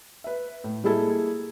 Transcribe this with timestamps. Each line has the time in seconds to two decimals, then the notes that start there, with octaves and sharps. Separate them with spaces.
0.24 B4 E5
0.64 A2
0.84 G3 G#3 A#3 E4 G#4 A4